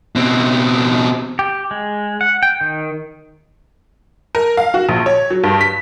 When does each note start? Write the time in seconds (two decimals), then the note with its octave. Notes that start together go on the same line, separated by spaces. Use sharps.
0.16 B2 C4
1.39 G4
1.71 G#3
2.21 F#5
2.43 G5
2.61 D#3
4.35 A#4
4.57 F5
4.74 F#4
4.89 A#1
5.06 C#5
5.31 F#3
5.44 G2
5.61 B6